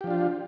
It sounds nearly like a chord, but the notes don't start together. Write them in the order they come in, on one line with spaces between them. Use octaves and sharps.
G4 F3 D4 F4